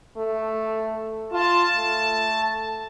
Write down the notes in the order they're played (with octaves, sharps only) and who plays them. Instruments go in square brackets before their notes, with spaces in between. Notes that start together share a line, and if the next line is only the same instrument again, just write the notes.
[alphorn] A3
[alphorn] F4 [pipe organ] A5
[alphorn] A3